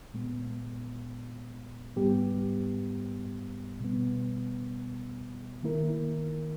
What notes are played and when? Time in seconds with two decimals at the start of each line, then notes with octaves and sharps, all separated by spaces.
0.14 A#2 G#3 B3
1.96 G#2 G3 B3 G4
3.80 B2 G3 B3
5.63 D#3 A#3 E4 A#4